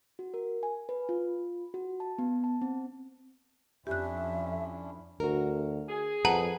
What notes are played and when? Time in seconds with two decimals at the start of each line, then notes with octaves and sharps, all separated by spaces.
0.19 F#4
0.34 A#4
0.63 G#5
0.89 B4
1.09 F4
1.74 F#4
2.00 A5
2.18 B3
2.44 A5
2.62 C4
3.87 F2 C#4 D4 E4 G4 E5 F#6
5.20 D2 F#4 A#4
5.89 G#4
6.25 F2 B4 F#5 A5 A#5 F#7